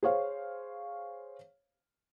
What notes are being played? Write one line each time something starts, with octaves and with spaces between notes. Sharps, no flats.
G#4 C5 C#5 F5